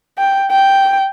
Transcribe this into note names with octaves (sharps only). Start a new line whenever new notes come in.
G5
G5